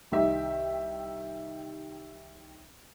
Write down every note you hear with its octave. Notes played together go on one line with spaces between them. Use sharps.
C2 D#3 D#4 G4 E5